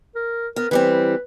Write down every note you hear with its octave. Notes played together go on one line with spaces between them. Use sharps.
A#4
B3 A#4
E3 G3 C4 B4